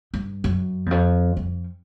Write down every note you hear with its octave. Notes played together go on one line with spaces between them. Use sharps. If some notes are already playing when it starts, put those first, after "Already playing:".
G2
F#2
E2
F2
F2